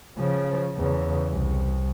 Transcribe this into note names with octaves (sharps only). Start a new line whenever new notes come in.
C#3 F3
E2 C#3
C2